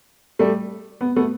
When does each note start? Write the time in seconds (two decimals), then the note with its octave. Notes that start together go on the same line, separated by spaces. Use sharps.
0.39 G3 A3
1.01 B3
1.16 A3 B3